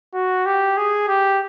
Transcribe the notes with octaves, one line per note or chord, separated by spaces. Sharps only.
F#4
G4
G#4
G4